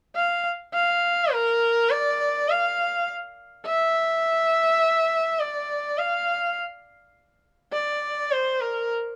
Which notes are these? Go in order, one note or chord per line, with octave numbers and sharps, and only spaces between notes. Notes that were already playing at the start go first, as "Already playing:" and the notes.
F5
F5
A#4
D5
F5
E5
D5
F5
D5
C5
A#4